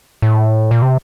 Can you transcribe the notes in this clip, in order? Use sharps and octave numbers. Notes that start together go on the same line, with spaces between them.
A2
A#2
C3